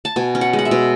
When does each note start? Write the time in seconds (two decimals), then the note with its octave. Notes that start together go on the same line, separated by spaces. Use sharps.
0.05 A5
0.16 B2 G#5
0.35 C#4
0.41 F#5
0.53 G#3
0.59 F#5
0.65 E5
0.71 B2